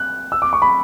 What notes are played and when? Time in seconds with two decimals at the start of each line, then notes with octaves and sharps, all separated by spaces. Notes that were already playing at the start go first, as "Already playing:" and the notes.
Already playing: F#6
0.32 E6
0.42 D6
0.53 C#6
0.62 B5